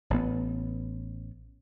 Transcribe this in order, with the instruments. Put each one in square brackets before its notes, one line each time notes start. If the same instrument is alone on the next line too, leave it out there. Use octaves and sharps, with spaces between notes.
[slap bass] A1 B3